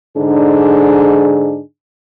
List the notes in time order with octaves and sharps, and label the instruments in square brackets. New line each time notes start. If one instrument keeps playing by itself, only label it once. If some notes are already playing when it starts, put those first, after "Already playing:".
[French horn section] G#2 D3 D4 D#4 G#4